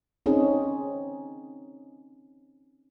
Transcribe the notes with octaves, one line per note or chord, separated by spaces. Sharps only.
C4 C#4 D#4 G#4